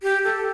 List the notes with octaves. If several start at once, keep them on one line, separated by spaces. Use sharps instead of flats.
G4
A4